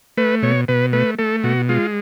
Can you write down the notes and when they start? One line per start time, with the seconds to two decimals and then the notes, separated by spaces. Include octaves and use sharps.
0.17 A3 B4
0.42 B2 C#5
0.68 B2 B4
0.93 A3 B4
1.18 A3 A4
1.43 B2 F#4
1.69 G#3 F4